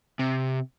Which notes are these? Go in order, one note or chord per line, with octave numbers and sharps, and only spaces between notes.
C3